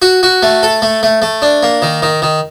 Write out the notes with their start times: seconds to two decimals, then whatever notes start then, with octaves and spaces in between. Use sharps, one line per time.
0.02 F#4
0.23 F#4
0.43 A3
0.63 A4
0.82 A3
1.03 A3
1.22 A3
1.42 D4
1.63 A#3
1.82 D#3
2.02 D#3
2.22 D#3